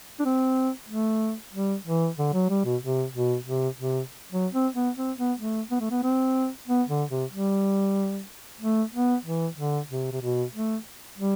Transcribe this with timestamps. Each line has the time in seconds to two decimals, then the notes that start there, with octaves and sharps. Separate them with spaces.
0.19 D4
0.25 C4
0.88 A3
1.53 G3
1.86 E3
2.18 D3
2.33 F#3
2.50 G3
2.65 B2
2.82 C3
3.13 B2
3.46 C3
3.78 C3
4.32 F#3
4.53 C4
4.75 B3
4.97 C4
5.18 B3
5.39 A3
5.71 B3
5.81 A3
5.91 B3
6.03 C4
6.68 B3
6.89 D3
7.10 C3
7.32 G3
8.60 A3
8.93 B3
9.25 E3
9.57 D3
9.89 C3
10.13 C3
10.21 B2
10.54 A3
11.17 G3